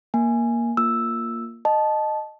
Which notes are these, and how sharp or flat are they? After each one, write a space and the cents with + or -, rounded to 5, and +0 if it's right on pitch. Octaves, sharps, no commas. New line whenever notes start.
A#3 +5 G#5 +0
A#3 -5 F4 +0 E6 +0
D#5 -15 A5 -15